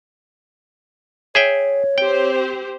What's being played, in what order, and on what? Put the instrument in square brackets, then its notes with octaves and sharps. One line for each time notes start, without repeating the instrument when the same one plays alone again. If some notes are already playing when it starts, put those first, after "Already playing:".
[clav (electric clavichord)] G#4 E5 G5 [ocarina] C#5
[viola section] C4 G4 C5 [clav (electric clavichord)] G5